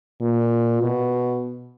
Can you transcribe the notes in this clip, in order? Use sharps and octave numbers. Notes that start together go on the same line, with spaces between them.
A#2
B2